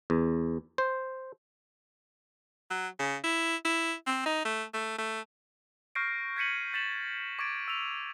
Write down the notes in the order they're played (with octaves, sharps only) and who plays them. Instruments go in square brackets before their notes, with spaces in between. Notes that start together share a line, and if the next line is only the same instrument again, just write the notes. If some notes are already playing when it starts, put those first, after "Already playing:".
[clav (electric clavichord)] E2
C5
[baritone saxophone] F#3
C#3
E4
E4
C4
D#4
A3
A3
A3
[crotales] C#6 F6 G6 A#6 C7 D7
A#6
G6 G#6 B6 C#7 D#7 F#7
G6 A6 B6 C#7 E7 F#7
C#6 D6 G#6 A6 D7
E6 D#7 F7